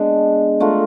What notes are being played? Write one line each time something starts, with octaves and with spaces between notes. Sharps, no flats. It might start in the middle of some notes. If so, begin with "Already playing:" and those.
Already playing: G#3 B3 D4
A3 D4 F4 A#4